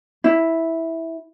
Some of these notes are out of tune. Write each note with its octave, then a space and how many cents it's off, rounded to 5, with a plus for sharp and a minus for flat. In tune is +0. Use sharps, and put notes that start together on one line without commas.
E4 -10